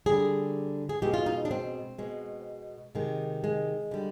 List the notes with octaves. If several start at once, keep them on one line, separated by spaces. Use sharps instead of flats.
D3 G3 G#4
G#4
B2 G#3 G4
F4
D#4
D4
C4
B2 G#3
C3 D#3 G#3
G#3
D3 G3